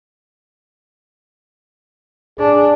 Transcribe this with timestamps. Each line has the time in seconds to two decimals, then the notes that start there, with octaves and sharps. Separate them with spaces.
2.39 D4 G#4